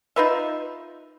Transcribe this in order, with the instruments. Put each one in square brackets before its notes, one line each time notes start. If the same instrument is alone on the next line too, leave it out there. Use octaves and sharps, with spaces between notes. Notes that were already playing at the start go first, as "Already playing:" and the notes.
[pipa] D#4 F4 B4 E5